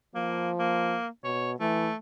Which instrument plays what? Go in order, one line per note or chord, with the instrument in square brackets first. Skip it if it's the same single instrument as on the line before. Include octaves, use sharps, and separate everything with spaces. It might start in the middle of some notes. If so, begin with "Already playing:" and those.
[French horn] F3 [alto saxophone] A#3
[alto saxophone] A#3
[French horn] B2 [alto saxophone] C#5
[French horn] E3 [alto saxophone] A3